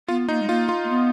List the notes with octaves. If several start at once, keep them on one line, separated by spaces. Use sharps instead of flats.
B3 F4
A#3 D#4
G#3
A#3 F4
F4
A#3
B3